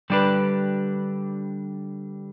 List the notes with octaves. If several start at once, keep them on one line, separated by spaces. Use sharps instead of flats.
D3 G3 D4 G4 B4